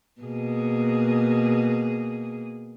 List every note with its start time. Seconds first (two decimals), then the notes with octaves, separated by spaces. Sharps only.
0.21 B2 A#3 G#4